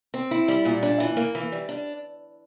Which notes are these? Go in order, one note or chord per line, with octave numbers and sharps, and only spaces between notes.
C4
E4
G3
A#2
D4
E3
A#3
E3
G3
D4